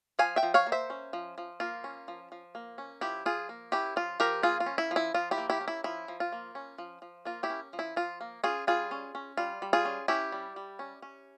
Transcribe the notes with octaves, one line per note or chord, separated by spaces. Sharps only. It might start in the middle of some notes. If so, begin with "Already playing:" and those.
F3 F5 G#5
E5 G5
F3
C#5 F5
A#3
C5 E5
C#4
F3
F3
A#3 F4
C#4
F3
F3
A#3
C#4
F3 E4 G4
F3 F4 G#4
A#3
C#4 E4 G4
F3 F4
F3 G4 A#4
A#3 F4 G#4
F4
C#4
E4
F3
E4
F3 F4
E4 G4
A#3
E4 G4
C#4
E4
F3 E4
F3
F4
A#3
C#4
F3
F3
A#3 F4
E4 G4
C#4
F3
E4
F3 F4
A#3
C#4 F4 G#4
G3 F4 G#4
C#4
C#4
G3 F4
G3
F4 G#4
C#4
C#4 E4 G4
G3
G3
C#4
C#4